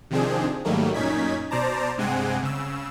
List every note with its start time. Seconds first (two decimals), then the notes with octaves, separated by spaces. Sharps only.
0.11 C3 D#3 F3 C4 D4 G#4
0.65 G#2 D#3 F#3 G3 A3 A#3
0.94 F#2 A#2 C#4 D#4 G#6 B6
1.51 B2 C5 D5 A5 A#5
1.98 G2 C3 G#3 C4 F#5 G#5
2.43 C#3 E6